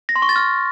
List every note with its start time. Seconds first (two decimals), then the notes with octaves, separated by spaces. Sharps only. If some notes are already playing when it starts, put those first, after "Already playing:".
0.09 A#6
0.16 C6
0.22 C#6
0.29 A6
0.36 F6